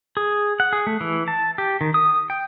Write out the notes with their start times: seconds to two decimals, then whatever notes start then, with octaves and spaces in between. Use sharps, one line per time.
0.17 G#4
0.60 F#5
0.73 G#4
0.87 A3
1.01 E3
1.28 A5
1.58 G4
1.81 D#3
1.94 D#6
2.30 G5